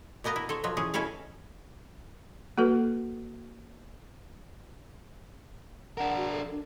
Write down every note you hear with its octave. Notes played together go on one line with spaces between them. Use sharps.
B2 A#3 B3 D#5 A#5
E4
A4 C5 C#5
B2 F3 F#3
E3 C#4 G#4
B2 C#4 E4 A4 C#5 F5
A#3 F#4 A4 B4
D4 A#4 F#5
F#4
A4
D4